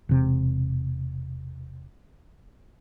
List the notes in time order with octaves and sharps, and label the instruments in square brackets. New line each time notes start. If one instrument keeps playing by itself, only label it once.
[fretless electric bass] E1 C3